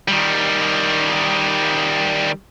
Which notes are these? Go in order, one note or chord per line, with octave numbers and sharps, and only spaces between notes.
D#3 G3